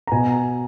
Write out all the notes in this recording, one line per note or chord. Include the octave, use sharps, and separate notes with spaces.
A#5
B2 G#5